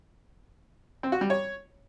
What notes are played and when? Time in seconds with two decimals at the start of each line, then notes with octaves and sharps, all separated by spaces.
1.03 C4
1.12 F#4
1.21 G3
1.30 C#5